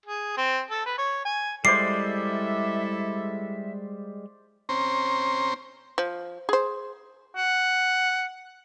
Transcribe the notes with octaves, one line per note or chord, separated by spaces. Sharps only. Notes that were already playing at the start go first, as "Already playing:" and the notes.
G#4
C4
A4
B4
C#5
G#5
G3 G#3 E4 A4 C5 D5 E5 C7
C4 C#4 C5 A#5
F3
G#4 C5
F#5